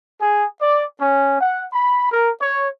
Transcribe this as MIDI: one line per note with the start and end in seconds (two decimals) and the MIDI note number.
0.21 0.47 68
0.61 0.86 74
1.01 1.39 61
1.41 1.66 78
1.73 2.10 83
2.12 2.31 70
2.42 2.69 73